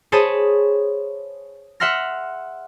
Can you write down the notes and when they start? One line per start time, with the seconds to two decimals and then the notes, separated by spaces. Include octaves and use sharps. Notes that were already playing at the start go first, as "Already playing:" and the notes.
0.12 G#4 C5 C#5 A5 B5 D#6
1.80 E5 F#5 C6 F6 A#6